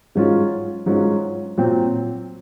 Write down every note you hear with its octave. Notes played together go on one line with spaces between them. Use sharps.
G#2 F#3 C#4 F4
G#2 F#3 C#4 F4
A#2 F#3 C4